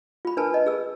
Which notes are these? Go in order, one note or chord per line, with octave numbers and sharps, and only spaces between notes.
F4 B5
D4 A#4 B4 G#5 A5
D#5
G#4 E6